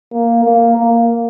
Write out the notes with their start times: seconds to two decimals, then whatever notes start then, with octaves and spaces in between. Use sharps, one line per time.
0.13 A#3
0.44 A#3
0.77 A#3